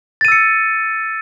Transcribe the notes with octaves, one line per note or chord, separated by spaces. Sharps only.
E6 A6 C#7 D#7